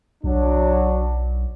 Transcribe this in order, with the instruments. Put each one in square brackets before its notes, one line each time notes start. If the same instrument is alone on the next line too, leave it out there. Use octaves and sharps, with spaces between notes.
[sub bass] B1 [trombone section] F#3 D4